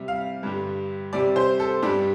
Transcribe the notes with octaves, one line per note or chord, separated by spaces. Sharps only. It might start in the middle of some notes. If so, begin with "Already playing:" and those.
Already playing: C3 G3
F5
G2 D3 G3
C3 G3 D5
C5
A4
G2 G3 D4